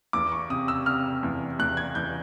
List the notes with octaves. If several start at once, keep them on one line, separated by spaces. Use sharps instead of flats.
E2 D6
C#6
C3 D#6
E6
C3 F6
E2
E2 F#6
G#6
E2 G6